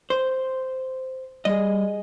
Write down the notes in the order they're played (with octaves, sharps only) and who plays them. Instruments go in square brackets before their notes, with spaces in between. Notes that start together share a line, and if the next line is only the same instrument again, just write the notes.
[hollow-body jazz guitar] C5
[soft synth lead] G3 [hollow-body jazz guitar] G#4 D#5